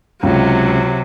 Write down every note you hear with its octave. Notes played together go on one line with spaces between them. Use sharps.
C#2 C3 F#3